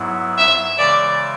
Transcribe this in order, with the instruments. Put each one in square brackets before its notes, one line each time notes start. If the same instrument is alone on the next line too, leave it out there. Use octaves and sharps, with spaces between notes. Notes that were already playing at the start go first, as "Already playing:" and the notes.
Already playing: [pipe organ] G#2 F#3 B3 E4
[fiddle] E5
[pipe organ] C#3 E3 G#3 [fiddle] D5